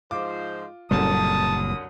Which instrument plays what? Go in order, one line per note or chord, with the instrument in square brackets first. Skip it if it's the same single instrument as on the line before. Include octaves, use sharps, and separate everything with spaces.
[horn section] G#2 F3 C5 [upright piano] F4 D6
[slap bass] F#1 A#2 G3 [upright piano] C2 F#2 D3 [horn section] A5 [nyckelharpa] D#6